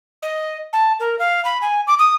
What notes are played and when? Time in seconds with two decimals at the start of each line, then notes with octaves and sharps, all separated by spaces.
0.22 D#5
0.73 A5
1.00 A#4
1.19 F5
1.45 B5
1.61 G#5
1.87 D6
1.99 D#6